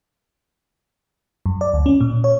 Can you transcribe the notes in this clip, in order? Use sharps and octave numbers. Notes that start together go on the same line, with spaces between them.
F#2
D5
D2
C#4
A#2
C#5